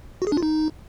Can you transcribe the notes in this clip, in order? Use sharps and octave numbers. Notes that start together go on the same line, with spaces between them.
F#4
G#4
D4
F4
D#4